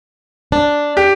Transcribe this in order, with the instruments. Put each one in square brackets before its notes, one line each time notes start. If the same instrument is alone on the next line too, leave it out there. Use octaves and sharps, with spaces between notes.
[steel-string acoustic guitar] D4
[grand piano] G4